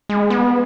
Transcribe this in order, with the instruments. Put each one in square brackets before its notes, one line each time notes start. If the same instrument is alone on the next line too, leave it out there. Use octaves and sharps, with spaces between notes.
[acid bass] G#3
B3